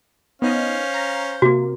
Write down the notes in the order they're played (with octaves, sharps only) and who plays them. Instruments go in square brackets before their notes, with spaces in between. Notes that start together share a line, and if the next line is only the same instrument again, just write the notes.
[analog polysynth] B3 D#4 D#5 [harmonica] C#4 C5 F5
[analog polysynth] A#5
[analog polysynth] C3 A#3 [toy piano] F#4